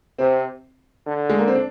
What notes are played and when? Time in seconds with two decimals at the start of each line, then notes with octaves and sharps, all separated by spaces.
0.18 C3 C4
1.07 D3
1.29 G#3
1.39 A#3
1.48 C4
1.55 D4